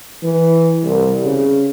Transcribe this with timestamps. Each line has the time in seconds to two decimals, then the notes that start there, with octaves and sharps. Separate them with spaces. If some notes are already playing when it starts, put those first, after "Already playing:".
0.23 E3
0.84 C2
1.25 C#3